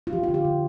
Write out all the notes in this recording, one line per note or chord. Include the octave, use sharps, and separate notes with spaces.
F4
F3 G4
F4
D3
G4
D3